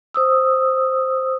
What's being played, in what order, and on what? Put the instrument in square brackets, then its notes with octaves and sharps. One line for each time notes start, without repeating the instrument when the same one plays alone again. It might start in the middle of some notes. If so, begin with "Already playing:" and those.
[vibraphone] C5 D#6 E6